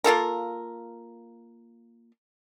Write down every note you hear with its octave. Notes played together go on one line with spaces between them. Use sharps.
A#3 F4 A4 A#4